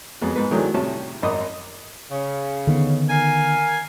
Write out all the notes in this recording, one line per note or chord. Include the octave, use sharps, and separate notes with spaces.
F2 F#3 G#3 B3
G#2 B3 B4
D#3 E3 F#3 G#3 A3 D4
A2 C3 G3 C#4 F#4 A5
G#1 F#2 D#5 B5 D6 D#6
C#3
D3 D#3 B3
A#4 F5 G#5